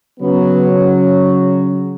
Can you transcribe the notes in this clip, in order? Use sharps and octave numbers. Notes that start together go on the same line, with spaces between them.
C#3 F#3 B3